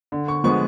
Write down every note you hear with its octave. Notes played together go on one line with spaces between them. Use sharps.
D3
C#6
F3 G#3 B3 C#6